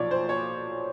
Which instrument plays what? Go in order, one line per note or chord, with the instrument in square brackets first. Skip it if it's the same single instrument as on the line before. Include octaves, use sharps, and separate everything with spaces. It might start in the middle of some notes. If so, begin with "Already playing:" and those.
Already playing: [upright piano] B1 A#2 F3 C#5 D5
C5
C#5